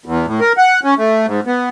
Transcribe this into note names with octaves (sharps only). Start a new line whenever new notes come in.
E2
A2
A#4
F#5
C#4
A3
G#2
B3